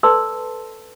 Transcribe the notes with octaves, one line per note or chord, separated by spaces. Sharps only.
A4 B4 D5 A5 C6 E6